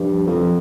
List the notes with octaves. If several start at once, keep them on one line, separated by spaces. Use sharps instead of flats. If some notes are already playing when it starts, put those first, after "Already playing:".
Already playing: G2 F3
F2 F#3
F3
F#3